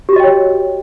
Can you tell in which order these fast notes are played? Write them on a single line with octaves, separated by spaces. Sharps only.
G4 F#4 D#5 G5 C#5